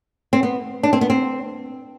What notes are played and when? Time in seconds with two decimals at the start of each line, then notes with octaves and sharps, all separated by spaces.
0.33 C4
0.43 B3
0.83 D4
0.93 C4
1.01 B3
1.10 C4